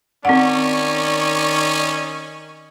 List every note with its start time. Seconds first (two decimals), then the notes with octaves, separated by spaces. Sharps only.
0.25 D#3 C4 C#4 D5 F#5 C#6